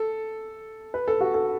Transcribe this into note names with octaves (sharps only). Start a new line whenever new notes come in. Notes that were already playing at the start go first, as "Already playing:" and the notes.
Already playing: A4
B4
A4
F#4
A4